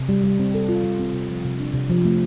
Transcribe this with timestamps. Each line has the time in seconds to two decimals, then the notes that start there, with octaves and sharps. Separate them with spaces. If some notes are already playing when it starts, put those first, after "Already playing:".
Already playing: C3
0.09 G3
0.24 G3
0.39 C4
0.55 A4
0.69 F4
0.84 G3
0.99 C4
1.14 C3
1.29 F3
1.45 C3
1.60 D4
1.74 C3
1.90 F3
2.05 A3